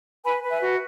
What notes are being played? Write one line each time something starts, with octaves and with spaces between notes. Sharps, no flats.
B4 G#5 B5
B4
E5 G#5
F#4